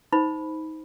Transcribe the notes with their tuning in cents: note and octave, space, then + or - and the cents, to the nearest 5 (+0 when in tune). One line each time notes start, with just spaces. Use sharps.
D#4 +20 C5 -10 B5 +0